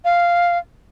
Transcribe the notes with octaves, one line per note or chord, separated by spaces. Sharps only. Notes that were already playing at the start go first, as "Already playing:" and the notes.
F5